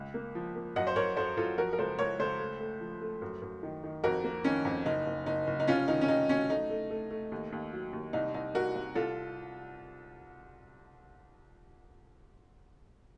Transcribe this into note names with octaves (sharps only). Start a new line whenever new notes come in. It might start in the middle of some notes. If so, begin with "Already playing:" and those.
Already playing: C#2
A#3
F3
A#3
F#2 D#5 F#5
C5
F#2 A#4 C#5
F#2 A4 C5
F#2 F4 A4
F3 F#4 A#4
A#4
C#2 A4 C5
C#2 A#4 C#5
C#2 A4 C5
A3
A3
F3
A3
F#2
F#2
D#3
D#3
F2 F#4 A#4
A#3
D#3 C#4
F2
F#1 D#4
F#1
F#1 D#4
F#1
D#4
F1 C#4 F4
D#3 D#4
C#4
D#3 D#4
F#3 C#4
A3 D#4
A3
A3
A3
D#2
D#2
F#3
D#2
C2 D#4
C2 D#4
C2 F#4 A#4
C2
C2 F4 A4